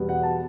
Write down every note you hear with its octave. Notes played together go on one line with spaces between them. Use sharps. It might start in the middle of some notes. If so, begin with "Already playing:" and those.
Already playing: E2 B2 G3 B3
F#5
A5